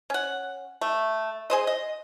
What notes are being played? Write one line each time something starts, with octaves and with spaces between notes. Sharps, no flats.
C#4 F#5
A3
G#4 C5 D#5
D#5